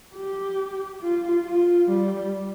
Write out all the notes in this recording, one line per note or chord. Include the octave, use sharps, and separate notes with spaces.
G4
F4
F4
G3